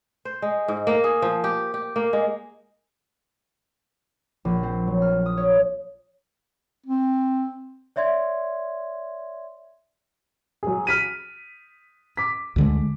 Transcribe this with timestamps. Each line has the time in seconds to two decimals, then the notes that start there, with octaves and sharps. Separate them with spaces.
0.25 C5
0.42 G#3
0.68 G#2
0.87 A#3
1.04 G#4
1.22 F3
1.44 G4
1.74 G4
1.96 A#3
2.13 G#3
4.45 A#1
4.63 C4
4.87 F#3
5.02 F6
5.26 D#6
5.37 C#5
6.86 C4
7.96 C#5 D5 E5 C6 G#6
10.63 F#3 G#4
10.87 F6 B6 D#7
12.17 D6 B6
12.56 D2 D3 G#3